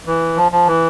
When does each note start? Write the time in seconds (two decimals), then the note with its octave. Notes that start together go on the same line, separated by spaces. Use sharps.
0.07 E3
0.37 F3
0.52 F3
0.67 E3